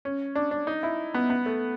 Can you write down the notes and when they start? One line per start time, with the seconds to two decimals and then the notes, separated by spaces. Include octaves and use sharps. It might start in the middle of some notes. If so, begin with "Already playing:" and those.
0.05 C#4
0.35 D4
0.51 D4
0.67 D#4
0.83 E4
1.14 B3
1.30 B3
1.46 A3